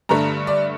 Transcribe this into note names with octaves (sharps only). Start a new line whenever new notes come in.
G2 D3 A3 A#5
D5